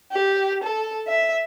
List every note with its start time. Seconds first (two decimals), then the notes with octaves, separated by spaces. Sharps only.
0.11 G4
0.63 A4
1.07 E5